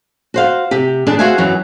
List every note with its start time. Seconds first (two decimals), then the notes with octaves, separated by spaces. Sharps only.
0.34 F#4 C5 F5
0.71 C3 G4
1.06 C#3 E3 D4 G#4
1.19 F#4 G#4 C5 E5 F5 G#5
1.38 F#2 E3 F#3